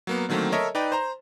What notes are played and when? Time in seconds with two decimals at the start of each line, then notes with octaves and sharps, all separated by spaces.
0.07 F#3 A#3 B3
0.29 D3 D#3 F#3 A3 A#3 C4
0.52 A4 A#4 C#5 D#5 E5
0.75 D#4 B4 D5 G5
0.92 C5 A#5